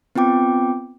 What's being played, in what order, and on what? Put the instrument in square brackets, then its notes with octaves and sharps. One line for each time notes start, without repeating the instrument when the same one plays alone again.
[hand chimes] B3 C4 F4 G5 D6